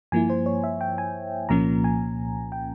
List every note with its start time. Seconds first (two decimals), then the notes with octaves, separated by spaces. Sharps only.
0.12 G2 F3 A#3 E4 G#5
0.30 C5
0.46 C#5
0.64 E5
0.81 G5
0.98 G#5
1.49 C2 A#2 F3 A#3 C#4 A#5
1.84 G#5
2.52 G5